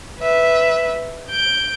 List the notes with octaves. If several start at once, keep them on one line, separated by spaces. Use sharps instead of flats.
B4 E5
G6 D7